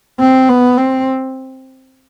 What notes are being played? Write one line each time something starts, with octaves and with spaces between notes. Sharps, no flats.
C4
B3
C4